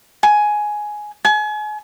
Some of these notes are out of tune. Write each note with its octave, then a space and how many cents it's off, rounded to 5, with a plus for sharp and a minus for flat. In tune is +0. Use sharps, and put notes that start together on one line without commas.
G#5 +10
G#5 +35